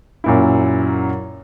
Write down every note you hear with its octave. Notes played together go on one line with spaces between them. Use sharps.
F#2 A#2 E4